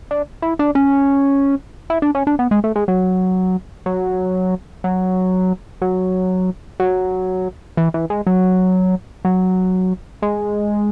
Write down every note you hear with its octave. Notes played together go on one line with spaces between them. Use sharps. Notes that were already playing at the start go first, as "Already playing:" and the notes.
D4
E4
D4
C#4
E4
D4
C#4
D4
B3
G#3
A3
G#3
F#3
F#3
F#3
F#3
F#3
E3
E3
G#3
F#3
F#3
G#3